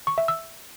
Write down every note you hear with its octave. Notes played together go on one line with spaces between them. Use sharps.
C#6
E5
E6